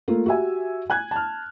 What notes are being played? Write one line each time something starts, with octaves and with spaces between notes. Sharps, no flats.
A3 A#3 F4
F#4 G4 E5 G#5
G#5 F#6 G#6
A5 F6